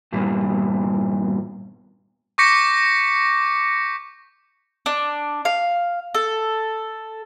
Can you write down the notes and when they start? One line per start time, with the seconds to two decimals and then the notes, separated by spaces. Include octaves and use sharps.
0.13 E2 G2 A#2
2.38 C#6 D6 G6 A#6 B6 C#7
4.86 D4
5.45 F5
6.15 A4